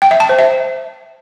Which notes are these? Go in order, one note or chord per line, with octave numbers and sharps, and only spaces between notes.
G5
E5
A5
C5
E5